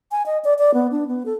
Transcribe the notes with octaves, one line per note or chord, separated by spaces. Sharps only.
G#5
D#5
D5
D5
B3
D4
B3
A4